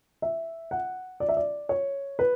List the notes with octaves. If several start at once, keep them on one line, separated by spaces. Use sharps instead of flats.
E5
F#5
D5
E5
D5
C#5
B4